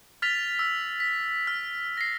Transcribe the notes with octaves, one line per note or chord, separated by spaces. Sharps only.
F6 A6 B6 F7
E6
B6
F6
A#6 C7